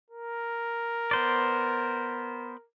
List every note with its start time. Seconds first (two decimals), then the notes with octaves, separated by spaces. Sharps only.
0.10 A#4
1.11 B3 C5 D5